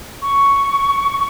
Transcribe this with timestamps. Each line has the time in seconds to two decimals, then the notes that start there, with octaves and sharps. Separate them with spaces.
0.22 C#6